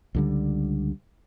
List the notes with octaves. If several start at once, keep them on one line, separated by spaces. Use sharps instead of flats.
C#2 D3 G3